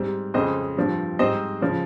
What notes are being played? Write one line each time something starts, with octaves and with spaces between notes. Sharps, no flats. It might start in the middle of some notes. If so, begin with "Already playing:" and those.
Already playing: G#2 G3 C4
F2 C#3 G#3 C5 D#5
G2 F3 C4
G#2 G3 C4 C5 D#5
C#3 F3 G#3